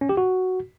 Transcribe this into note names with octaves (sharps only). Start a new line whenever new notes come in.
C#4
G4
F#4